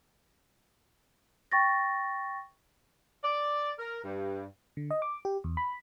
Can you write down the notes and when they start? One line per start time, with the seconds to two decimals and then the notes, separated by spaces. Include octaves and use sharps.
1.52 G5 C#6 A6 A#6
3.23 D5
3.79 A#4
4.04 G2
4.77 D3
4.91 D#5
5.02 D6
5.25 G4
5.44 E2
5.57 B5